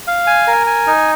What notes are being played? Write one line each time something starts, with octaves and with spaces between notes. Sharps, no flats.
F5
G#5
A#4
G#5
D#4